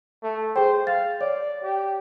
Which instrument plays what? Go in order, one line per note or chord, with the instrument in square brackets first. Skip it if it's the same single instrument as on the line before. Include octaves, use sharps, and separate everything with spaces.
[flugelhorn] A3
[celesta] G#4 G5 [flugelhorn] C5
[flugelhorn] F5 [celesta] A6
[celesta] C#5 [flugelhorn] D5
[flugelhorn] G4